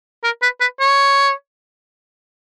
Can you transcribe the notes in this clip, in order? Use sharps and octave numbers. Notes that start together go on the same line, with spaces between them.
A#4
B4
B4
C#5